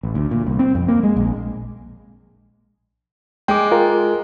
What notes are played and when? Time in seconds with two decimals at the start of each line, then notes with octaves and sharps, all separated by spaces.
0.03 A1
0.15 D2
0.31 A#2
0.47 C2
0.59 C4
0.75 F2
0.89 A#3
1.03 G#3
1.16 A#1
3.48 G#3 G5 D6
3.71 F4 A#4